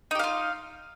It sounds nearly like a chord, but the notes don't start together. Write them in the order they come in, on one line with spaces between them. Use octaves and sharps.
D#4 G4 F5 F4